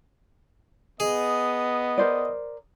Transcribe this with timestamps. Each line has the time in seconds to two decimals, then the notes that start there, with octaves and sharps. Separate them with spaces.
1.00 B3 G#4 D#5
1.98 A#4 C5 D5